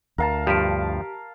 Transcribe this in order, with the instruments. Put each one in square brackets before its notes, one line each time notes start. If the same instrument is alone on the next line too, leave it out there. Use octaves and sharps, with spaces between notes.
[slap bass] D2 [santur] A#4 F5 A5
[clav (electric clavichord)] G2 F3 [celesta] G4 B6 D7